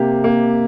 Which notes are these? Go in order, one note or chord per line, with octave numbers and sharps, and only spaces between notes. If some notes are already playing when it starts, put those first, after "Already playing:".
Already playing: C3 A#3 G4
A#3